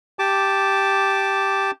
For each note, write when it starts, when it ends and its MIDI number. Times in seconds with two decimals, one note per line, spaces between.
0.19 1.71 67
0.19 1.71 81
0.19 1.71 86